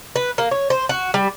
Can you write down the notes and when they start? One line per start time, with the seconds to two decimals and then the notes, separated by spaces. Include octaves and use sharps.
0.16 B4
0.38 A#3
0.51 C#5
0.70 C5
0.89 F#4
1.14 G3